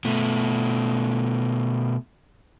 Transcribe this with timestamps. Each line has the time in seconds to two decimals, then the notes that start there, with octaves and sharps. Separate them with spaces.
0.05 B2 A3